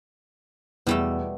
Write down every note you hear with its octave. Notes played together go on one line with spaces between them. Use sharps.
E2 B2 G3 A3